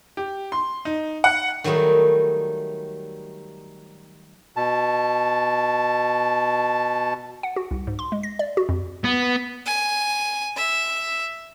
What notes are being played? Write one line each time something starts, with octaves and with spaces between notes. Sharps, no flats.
G4
C6
D#4
F#5
D#3 F#3 G3 A3 D#4
B2 A5
F#5
F#4
C2
G#2
C6
G#3
A#6
D5
F#4
F2
B3
G#5
E5